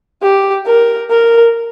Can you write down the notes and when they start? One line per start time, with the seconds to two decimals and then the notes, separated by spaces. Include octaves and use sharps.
0.23 G4
0.66 A#4
1.10 A#4